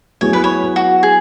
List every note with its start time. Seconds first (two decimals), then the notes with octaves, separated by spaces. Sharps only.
0.21 F#3 B3 E4 G#4 C#5
0.33 B4
0.44 C#5
0.76 F#4
1.03 G#4